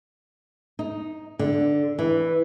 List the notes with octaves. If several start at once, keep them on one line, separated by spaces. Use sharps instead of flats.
D#4
D3
E3